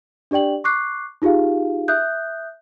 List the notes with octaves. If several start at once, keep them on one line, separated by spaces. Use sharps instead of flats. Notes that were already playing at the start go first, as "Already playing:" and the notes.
D4 G4 D5 G5 F#7
C#6 D6 F#6 C7
D#4 F4 G4 G#4 F5
E5 D#6 F#6 G6